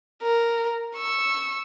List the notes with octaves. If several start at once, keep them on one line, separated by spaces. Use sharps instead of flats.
A#4
C#6 E6